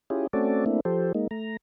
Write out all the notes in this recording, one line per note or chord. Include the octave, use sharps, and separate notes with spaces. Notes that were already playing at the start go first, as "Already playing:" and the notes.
C#4 E4 F4 G4 G#4
A3 C4 C#4 F#4 A4 D5
A3 A#3 C4 D4 E4
F3 G4 A4 C5
G#3 A#3 D#4
A3 A#5